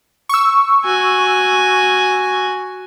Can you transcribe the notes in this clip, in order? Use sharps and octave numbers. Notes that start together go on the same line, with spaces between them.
C#6 E6
F#4 G#5